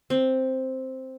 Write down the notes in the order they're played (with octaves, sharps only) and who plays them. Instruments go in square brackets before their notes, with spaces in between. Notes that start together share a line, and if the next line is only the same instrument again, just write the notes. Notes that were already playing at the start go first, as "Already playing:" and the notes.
[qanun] C4